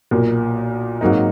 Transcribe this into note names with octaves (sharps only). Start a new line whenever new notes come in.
B1 A#2 A#3
G#1 G#2 F#3 A#3 D#4